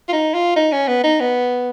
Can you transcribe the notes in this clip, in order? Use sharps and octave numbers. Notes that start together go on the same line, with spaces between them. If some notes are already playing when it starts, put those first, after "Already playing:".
F4
D#4
F4
D#4
C#4
B3
D#4
B3